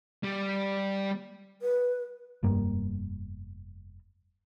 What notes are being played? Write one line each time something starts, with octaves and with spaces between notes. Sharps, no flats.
G3
B4
F1 G2 G3 A#3